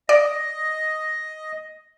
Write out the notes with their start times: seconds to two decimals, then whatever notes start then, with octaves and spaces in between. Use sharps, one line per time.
0.09 D5 D#5